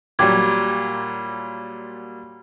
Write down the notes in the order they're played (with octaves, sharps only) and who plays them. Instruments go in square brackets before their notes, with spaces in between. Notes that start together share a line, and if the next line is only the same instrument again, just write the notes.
[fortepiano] A#2 F#3 G3 [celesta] G5 D6 G#6